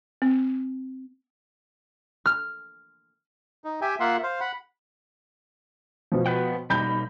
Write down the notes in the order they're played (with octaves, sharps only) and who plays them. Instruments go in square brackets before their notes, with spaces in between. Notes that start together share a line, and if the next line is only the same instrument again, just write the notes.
[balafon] C4
[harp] F6
[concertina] D#4
G4 E5 G5 G#5
A#3 F4 E5 F#5 C6
C5 F5
F#5 B5
[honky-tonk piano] B2 F3
[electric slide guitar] B4 F#5 G5
[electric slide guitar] B2 G3 D#4 [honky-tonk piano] B5 G6